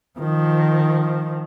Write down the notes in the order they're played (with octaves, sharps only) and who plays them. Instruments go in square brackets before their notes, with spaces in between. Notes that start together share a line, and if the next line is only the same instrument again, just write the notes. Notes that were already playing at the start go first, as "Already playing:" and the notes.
[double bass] D#3 F3